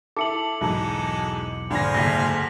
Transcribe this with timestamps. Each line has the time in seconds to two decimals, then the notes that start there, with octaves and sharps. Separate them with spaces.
0.17 E4 A4 D6 C#7 F#7
0.61 B1 E2 G#2 E3 F#3 G#3 A4
1.71 G#1 D3 C5 F5 G#5 A#6
1.94 F#1 D2 G#2 A#6 B6